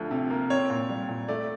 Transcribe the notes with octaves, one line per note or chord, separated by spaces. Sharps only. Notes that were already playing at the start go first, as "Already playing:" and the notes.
Already playing: D2 F3
C3
A#3
C4 C#5
A#2
G3
A#2
A3 D5